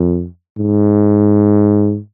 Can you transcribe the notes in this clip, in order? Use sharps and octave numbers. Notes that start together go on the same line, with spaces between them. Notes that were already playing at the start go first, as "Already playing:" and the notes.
Already playing: F2
G#2